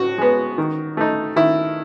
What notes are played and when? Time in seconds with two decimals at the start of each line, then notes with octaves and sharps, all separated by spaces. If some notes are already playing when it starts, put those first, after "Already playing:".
Already playing: A2 F#4
0.18 G#3 B3
0.58 D#3
0.97 A3 D#4
1.36 D#3 E4